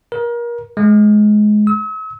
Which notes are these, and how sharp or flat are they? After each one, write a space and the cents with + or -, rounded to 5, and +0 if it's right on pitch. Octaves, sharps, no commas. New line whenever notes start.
A#4 +30
G#3 +20
E6 -45